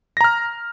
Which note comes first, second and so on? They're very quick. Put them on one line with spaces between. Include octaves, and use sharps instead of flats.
A#6 A#5 F6